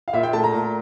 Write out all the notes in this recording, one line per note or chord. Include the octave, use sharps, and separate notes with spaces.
F5
A#2 E5
G5
A3 A5
A#5
A#2